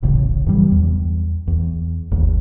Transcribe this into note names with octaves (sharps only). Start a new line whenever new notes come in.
D1 A1 C#3
G2 E3 F#3 G3
E2
E2
G1 D#2